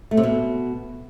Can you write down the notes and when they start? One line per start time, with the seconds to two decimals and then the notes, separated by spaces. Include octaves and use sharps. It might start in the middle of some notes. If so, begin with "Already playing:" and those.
0.11 A3
0.17 C3
0.23 B2